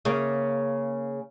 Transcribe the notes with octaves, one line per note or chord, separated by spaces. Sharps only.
C#3 A#3